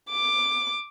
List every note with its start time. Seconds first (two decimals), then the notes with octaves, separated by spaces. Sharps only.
0.11 D6